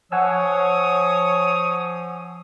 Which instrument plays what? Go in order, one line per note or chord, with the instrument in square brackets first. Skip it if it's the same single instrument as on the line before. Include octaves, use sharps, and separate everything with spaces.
[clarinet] F3 [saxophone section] C#5 [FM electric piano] F#5 G#5 E6 [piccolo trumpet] D#6